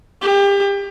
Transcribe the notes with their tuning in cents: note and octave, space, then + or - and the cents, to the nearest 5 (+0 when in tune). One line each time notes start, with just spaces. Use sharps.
G4 +30